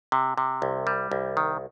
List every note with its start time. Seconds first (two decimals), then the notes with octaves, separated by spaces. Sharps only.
0.12 C3
0.38 C3
0.62 C2
0.87 G3
1.11 C2
1.37 D#3